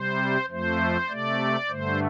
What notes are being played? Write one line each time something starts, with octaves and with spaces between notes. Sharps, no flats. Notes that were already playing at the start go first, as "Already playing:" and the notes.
Already playing: C3 G3 C5
F2 F3 A3 C5
C3 A3 D5
G2 D3 A3 C5